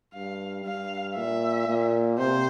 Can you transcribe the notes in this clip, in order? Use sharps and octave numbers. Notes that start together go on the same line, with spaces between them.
G2 F5
G2 F5
A#2 E5
A#2
C3 C5